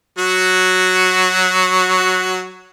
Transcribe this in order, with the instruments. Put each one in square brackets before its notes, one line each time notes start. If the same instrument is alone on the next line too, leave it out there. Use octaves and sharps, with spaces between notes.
[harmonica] F#3 F#4